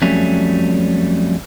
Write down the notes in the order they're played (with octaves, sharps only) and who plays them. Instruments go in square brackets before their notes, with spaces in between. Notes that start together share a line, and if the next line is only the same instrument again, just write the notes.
[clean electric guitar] F2 F#3 G3 A3 C#4